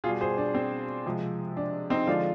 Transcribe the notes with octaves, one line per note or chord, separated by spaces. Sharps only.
B2 G3 F4 G#4
G#4 C5
D4
C4
C3 F3 G#3
D4
C4 D#4
D3 F3 G#3 D4 F4